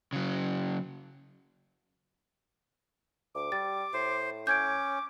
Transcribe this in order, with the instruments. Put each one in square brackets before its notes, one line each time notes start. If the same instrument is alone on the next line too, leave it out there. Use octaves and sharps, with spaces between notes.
[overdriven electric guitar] C#3 F#3
[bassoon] D2 [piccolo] D6
[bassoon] G3 [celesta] A6
[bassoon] A2 [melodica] C5
[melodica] C#4 [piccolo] D6 [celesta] G6 G#6 D7